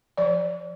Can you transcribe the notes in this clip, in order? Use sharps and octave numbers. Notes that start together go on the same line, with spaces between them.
F3 D5